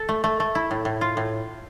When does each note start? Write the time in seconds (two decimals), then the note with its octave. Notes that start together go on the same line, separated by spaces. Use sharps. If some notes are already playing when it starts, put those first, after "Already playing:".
Already playing: A4
0.09 A3
0.24 A3
0.40 A3
0.55 E4
0.71 A2
0.85 A2
1.01 F4
1.17 A2